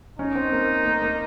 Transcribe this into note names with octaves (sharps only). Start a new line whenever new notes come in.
C#4 D#4
C4
A#3
A#3
A#3